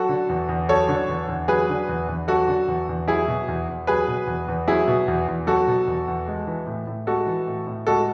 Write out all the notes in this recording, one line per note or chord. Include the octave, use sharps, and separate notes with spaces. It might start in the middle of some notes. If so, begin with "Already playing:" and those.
Already playing: F#3 F#4 A4
D3
E2
E2
F#3 A4 C#5
D3
E2
E2
F#3 G#4 B4
D3
E2
E2
F#3 F#4 A4
D3
E2
E2
F#3 E4 G#4
B2
E2
E2
F#3 G#4 B4
B2
E2
E2
F#3 E4 G#4
B2
E2
E2
F#3 F#4 A4
B2
E2
E2
G#3
E3
A2
A2
G#3 F#4 A4
E3
A2
A2
G#3 F#4 A4